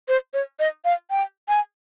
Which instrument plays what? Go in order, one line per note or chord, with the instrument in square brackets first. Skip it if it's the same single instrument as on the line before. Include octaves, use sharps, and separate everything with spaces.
[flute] C5
C#5
D#5
F5
G5
G#5